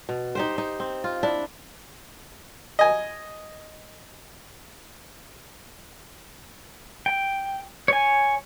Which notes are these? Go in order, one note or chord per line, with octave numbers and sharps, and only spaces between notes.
B2
D#4 G4 C5
D#4
C4
F4
D4 E4
D#5 G#5
G5
C#5 G#5